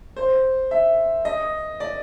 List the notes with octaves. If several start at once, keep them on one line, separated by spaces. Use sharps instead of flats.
C5
E5
D#5
D5